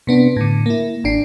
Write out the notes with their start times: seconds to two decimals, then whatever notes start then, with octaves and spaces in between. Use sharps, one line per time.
0.07 C3 B3 D4
0.36 A2 D3
0.66 A#3 E4
1.04 G#1 D4 C7